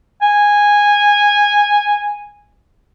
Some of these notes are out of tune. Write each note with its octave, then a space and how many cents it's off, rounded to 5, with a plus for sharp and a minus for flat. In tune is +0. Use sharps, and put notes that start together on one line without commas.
G#5 -10